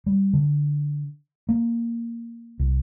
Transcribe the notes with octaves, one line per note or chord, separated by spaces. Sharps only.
G3
D3
A#3
C2